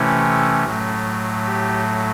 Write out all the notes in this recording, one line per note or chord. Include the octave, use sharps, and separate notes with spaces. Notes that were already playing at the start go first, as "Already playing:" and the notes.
Already playing: C3 E3 A3 C#4 E4
A2 F#3 A3
G4